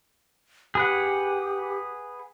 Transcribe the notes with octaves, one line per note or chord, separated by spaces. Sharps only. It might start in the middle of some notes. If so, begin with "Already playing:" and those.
G4 G#4 B4 F#5